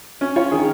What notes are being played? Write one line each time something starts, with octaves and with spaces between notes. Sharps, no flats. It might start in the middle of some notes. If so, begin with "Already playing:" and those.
C#4
F4 C#5
D#3 G#4